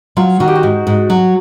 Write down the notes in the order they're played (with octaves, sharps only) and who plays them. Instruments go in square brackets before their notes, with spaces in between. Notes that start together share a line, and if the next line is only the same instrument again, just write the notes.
[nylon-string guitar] F#3 [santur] F4
[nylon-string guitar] D#3 [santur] F#4
[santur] G4
F#4
[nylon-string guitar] G#2
G#2
F#3